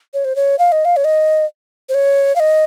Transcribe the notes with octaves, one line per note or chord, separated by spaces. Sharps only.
C#5
C5
C#5
F5
D#5
F5
C#5
D#5
C5
C#5
F5
D#5